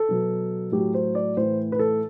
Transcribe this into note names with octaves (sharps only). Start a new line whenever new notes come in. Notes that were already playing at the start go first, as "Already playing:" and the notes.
Already playing: A4
B2 F#3
A2 F#3 G4
C5
D5
A2 E3 C5
B4
A4